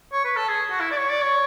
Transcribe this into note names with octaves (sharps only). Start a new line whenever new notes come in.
C#5
B4
A4
G#4
F#4
E4
D5
C#5
D5
C#5